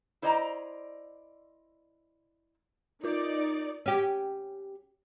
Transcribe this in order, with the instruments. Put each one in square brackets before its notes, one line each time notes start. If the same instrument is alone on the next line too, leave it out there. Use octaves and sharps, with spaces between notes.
[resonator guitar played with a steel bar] E4 C5 D5 D#5 A5 A#5
[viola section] D#4 D5 [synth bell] F4 A#4 D6
[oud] C#4 G4